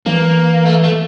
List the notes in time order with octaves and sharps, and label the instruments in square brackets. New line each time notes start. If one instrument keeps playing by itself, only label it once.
[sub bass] E3 [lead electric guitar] A#3
[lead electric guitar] A3
A3